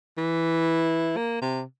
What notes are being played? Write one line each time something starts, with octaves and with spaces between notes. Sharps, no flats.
E3
A#3
C3